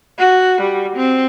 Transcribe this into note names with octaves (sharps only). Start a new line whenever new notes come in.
F#4
G3
C4